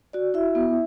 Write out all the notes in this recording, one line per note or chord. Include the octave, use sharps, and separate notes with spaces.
F#4 D5
E4 E5
B3